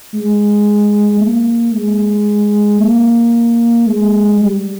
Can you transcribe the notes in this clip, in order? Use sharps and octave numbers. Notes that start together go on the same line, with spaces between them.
G#3
A#3
G#3
A#3
G#3
G3